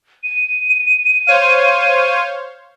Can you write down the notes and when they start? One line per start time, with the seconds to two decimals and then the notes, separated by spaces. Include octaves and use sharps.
0.23 D#7
1.27 C5 C#5 F5